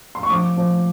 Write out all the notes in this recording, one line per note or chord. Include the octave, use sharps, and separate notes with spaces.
C6
C#6
F3 D6
F3